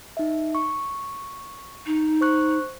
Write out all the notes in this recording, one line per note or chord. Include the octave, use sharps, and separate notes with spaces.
D#4 E5
C#6
D#4
C5 C#6 F#6